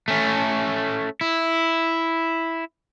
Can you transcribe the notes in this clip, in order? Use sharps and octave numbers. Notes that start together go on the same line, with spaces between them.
A3 C#4
E4